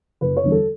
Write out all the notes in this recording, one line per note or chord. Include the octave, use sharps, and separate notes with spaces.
F#1 B4
C#5
E2 D3 G3
A4